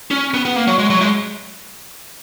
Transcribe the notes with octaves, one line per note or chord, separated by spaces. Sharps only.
C#4
B3
B3
A#3
F#3
G#3
F#3
G#3